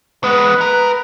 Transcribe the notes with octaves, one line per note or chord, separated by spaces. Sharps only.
G#3 B3 B4
A#4